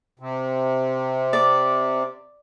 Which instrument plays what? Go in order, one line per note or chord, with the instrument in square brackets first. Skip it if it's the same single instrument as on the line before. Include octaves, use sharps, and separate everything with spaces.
[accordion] C3
[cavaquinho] D5